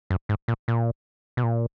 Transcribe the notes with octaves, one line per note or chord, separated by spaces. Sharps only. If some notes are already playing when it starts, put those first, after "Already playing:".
F#2
G#2
A#2
A#2
B2
A#2